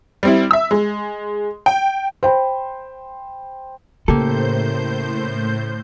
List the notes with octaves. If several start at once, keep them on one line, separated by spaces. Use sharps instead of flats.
G3 C4 E4
E5 E6
G#3
G5
C5 G5 B5
A2 C#3 A#3 G4 A4 C5 G6